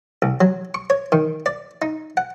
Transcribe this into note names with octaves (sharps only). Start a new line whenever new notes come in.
C2
F#3
C#6
C#5
D#3
D5
D#4
F#5